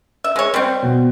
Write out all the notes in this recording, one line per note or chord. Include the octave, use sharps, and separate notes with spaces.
E5
G#3 C#5
G3 C4
B2